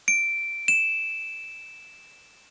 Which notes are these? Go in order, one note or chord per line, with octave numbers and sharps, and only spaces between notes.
D7
E7